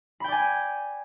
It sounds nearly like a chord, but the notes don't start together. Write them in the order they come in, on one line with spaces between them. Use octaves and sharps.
B5 G5 D5 G#5